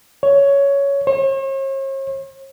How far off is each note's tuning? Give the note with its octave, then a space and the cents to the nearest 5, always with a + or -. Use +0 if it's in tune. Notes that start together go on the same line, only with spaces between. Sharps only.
C#5 +10
C#5 -45